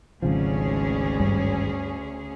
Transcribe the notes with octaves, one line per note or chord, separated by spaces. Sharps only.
G#1 D2 C#3 F3 C#4 G#4
G2